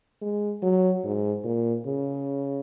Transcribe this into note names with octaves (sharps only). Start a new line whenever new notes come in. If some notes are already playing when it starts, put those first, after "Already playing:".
G#3
F#3
G#2
A#2
C#3